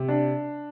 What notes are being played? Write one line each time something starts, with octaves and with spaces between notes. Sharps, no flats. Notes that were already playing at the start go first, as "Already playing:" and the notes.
Already playing: C3
D4